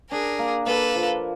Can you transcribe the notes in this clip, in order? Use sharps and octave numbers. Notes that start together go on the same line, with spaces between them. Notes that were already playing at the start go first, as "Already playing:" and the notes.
D4 G#4 A#4
A#3
A#3 A4 B4
F3